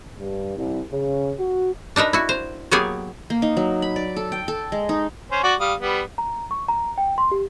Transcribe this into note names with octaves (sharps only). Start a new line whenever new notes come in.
G2
C2
C#3
F#4
D4 D#4 A#4 B4
E4 F#4
C5
F#3 A#3 B3 G4 G#4 G#5
A#3
D#4
F#3
B5
D5
A4
G5
A4
G#3
D#4
C#4 C5
F#4 D5 C#6
G3 F5 D#6
G3 B3
A#5
C#6
A#5
G5
C6
G4